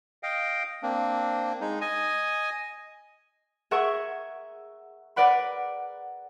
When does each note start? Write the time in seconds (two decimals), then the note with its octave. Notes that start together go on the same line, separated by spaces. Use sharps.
0.23 D#5 F5 G5
0.83 A#3 C4 D4
1.61 G#3 D#4
1.81 D#5 G#5
3.71 G#4 A#4 E5 F#5 C#6
5.16 A#4 B4 D5 F#5 B5